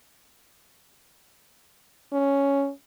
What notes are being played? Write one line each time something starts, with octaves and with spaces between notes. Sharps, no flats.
C#4